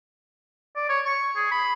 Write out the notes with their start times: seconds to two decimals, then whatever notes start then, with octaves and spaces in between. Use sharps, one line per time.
0.76 D5
0.89 C#5
1.06 C#6
1.36 G#4
1.51 B5